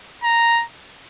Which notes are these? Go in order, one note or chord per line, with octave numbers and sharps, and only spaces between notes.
A#5